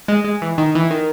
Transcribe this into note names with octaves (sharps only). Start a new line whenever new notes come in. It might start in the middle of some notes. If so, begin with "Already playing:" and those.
G#3
G#3
E3
D#3
E3
D#3